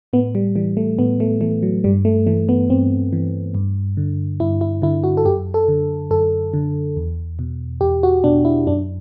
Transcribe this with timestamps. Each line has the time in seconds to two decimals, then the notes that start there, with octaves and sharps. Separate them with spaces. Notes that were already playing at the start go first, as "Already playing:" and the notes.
0.13 A2 B3
0.35 G3
0.56 E3 G3
0.77 A3
0.98 A2 B3
1.20 A3
1.41 E3 A3
1.63 F#3
1.84 G2 G3
2.05 A3
2.27 E3 A3
2.49 B3
2.69 G2 C4
3.13 E3
3.54 G2
3.97 D3
4.40 G2 E4
4.61 E4
4.82 D3 E4
5.04 F#4
5.17 A4
5.25 F#2 G4
5.54 A4
5.68 D3
6.10 F#2 A4
6.54 D3
6.97 E2
7.39 B2
7.81 E2 G4
8.03 F#4
8.24 B2 D4
8.45 E4
8.67 F#2 D4